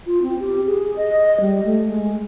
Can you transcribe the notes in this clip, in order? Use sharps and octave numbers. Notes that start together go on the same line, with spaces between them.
F4
C4
G4
G#4
D#5
G3
A3
G#3